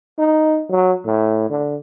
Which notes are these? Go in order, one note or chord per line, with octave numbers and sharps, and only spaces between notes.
D#4
F#3
A2
D3